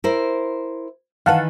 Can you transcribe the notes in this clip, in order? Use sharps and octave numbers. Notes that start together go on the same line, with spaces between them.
E4 A#4 C5
D#3 E3 B4 F5 F#5 A5